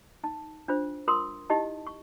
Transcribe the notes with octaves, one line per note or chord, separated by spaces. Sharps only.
D#4 A5
D4 F4 C5
F4 A#4 C6 D#6
D#4 E4 G4 D#5 A5
C#6